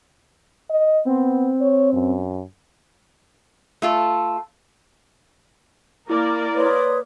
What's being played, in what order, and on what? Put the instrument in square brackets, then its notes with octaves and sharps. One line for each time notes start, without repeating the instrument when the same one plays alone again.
[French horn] D#5
[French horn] B3 [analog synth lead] C4
[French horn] C#5
F#2
[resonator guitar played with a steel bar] A3 F4 A4
[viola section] A#3 A#4 D5 [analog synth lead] E4 [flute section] A#5 D6
[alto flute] B4 [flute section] C#5 C6 D#6